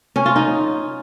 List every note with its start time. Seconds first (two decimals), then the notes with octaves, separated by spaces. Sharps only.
0.16 C#4
0.26 F4
0.36 D#4